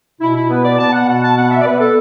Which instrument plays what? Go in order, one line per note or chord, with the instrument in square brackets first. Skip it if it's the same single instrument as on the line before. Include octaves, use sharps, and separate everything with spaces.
[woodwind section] B2 E4
E4
B3 B4
D5
B3 A5
F#5
B2 F#5
A5
B3 F#5
E5
D5
B3 B4
A4